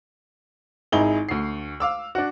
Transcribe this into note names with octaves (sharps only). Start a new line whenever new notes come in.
G#1 D#4 E4 G#4 G7
D2 C7
F5 D6 E6
D4 F#4